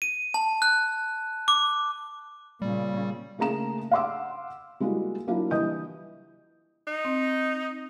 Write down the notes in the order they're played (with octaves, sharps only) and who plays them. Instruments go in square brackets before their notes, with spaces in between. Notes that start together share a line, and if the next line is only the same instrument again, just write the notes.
[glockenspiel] D#7
A5
F#6
D6
[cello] A#2 C#3 [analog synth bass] G3
[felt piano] C#3 A3 A#3 G#4 A#5 E7
F5 F#5 C6 D6 E6
G3 G#3 A#3 E4 F#4
F#3 A#3 D4 E4 F4
E3 G3 D#5 D#6 G6
[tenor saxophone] D#4
[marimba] C4